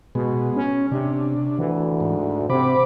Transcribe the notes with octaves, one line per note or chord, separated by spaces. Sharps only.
B2 G#3 B3
C#4
C3 D4
D2 E3
G#2
C3 C4 B5 D6